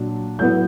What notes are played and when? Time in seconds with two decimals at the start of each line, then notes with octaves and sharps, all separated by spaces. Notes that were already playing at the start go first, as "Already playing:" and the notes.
Already playing: A#2 F#3 D4
0.39 A2 F#3 B3 E4 G6